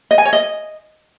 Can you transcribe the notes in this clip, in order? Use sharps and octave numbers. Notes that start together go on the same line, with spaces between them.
D#5
G#5
C#5
D#5